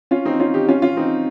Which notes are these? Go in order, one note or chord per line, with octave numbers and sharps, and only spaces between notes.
C#4 F4
C4 D#4
C#4 F4
D#4 G4
C#4 F4
C#4 F4
C4 D#4